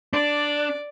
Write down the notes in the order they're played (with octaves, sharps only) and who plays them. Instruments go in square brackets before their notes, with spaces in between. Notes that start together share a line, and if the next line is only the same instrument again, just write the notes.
[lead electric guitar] D4 [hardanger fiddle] D5